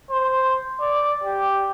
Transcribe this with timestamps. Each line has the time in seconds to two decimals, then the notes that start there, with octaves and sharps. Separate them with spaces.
0.11 C5
0.81 D5
1.24 G4